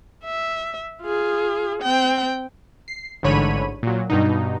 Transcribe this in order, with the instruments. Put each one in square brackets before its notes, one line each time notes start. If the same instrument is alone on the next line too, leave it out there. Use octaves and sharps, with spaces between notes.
[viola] E5
F4 G#4
C4 G5
[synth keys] C7
A1 G#2 D3 C#5 B5 D#7
A#2 F#3
G2 B2 D#4